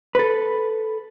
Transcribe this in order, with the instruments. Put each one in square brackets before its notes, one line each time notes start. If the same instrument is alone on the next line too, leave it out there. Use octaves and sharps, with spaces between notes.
[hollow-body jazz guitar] A4 B4